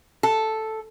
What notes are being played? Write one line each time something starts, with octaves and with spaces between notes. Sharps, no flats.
A4